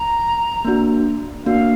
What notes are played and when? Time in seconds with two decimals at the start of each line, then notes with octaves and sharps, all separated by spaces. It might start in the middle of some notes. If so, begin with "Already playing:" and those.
Already playing: A#5
0.65 A#3 D4 F#4
1.46 A#3 D4 F#4 F5